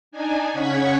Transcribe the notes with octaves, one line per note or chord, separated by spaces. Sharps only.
D4 D#4 G#5
C#3 C#4 F#5 C#6 G#6 B6